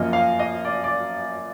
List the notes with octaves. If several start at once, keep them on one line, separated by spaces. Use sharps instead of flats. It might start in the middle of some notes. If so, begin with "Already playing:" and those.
Already playing: F#2 F3 A#3 D#5
F5
D#5
D5
D5